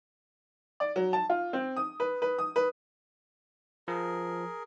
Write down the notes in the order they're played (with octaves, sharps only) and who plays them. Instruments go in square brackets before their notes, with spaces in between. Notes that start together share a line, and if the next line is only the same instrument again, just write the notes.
[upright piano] D5
F#3
A5
F4
C4
D#6
B4
B4
D#6
B4
[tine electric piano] F3 [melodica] G#4 A#4